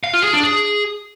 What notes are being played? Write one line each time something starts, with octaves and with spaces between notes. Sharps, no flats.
F5
F4
G#4
D4
G#4